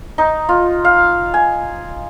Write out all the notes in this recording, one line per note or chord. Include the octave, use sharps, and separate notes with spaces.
D#4
F4
F5
G#5